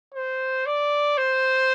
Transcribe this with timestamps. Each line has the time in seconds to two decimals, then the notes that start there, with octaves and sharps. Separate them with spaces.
0.14 C5
0.66 D5
1.18 C5